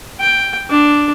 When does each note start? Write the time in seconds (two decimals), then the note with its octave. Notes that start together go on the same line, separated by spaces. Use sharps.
0.20 G5
0.71 D4